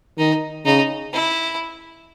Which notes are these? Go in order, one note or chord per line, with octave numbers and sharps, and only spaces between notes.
D#3 D#4
C#3 D#4
E4